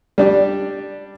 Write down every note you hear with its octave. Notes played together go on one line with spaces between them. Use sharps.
G3 D4 G4